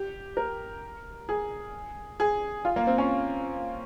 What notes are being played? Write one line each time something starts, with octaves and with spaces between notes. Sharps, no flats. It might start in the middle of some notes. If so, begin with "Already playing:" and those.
Already playing: G4
A#4
G#4
G#4
F4
A#3
C4
C#4